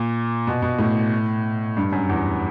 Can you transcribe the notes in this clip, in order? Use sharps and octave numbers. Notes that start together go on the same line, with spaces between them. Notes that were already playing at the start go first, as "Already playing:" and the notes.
Already playing: A#2
B2
B2
A2
G2
F#2
E2